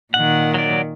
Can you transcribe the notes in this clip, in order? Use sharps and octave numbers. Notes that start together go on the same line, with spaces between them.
A#2 D#3 F#5
F#3 D5